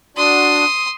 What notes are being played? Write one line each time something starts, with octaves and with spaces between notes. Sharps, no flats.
D4 F#4 D5 C6 D#6